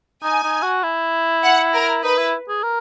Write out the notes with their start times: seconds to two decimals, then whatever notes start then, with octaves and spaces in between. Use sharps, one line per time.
0.23 D#4 G#5
0.44 D#4
0.63 F#4
0.84 E4
1.43 F#5
1.74 A#4
2.04 D#4 B4
2.18 E4
2.49 G#4
2.63 A#4